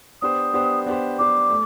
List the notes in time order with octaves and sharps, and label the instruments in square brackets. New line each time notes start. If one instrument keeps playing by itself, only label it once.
[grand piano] B3 D4 G4 C5 [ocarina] D#6
[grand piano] B3 D4 G4 C5
B3 D4 G4 C5
[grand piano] B3 D4 G4 C5 [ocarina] D6
[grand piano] A3